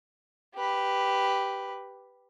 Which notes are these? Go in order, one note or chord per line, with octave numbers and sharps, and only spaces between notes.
G4 B4